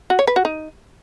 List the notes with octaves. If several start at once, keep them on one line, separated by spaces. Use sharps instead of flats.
F#4
C#5
B4
F#4
D#4